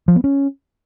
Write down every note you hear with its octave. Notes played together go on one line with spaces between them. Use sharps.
F3
B3
C#4